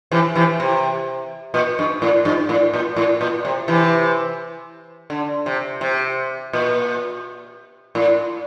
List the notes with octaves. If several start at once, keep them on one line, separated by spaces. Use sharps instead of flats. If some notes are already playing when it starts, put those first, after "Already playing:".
C3 E3
C3 E3
C3
A#2
G2
A2
G2
A2
A#2
A2
A#2
C3
C3 E3
D3
C3
C3
A#2
A2